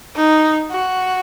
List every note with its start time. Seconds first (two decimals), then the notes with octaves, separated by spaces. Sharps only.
0.16 D#4
0.71 F#4